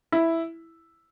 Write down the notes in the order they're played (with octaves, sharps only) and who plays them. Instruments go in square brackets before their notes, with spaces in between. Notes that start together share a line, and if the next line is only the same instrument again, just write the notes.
[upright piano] E4